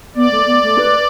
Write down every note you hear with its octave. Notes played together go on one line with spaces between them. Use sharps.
B3 D5
A3
B3
A3
B4